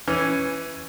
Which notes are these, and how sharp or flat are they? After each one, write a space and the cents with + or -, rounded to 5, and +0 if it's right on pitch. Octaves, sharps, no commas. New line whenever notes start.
E3 +5 C#4 +0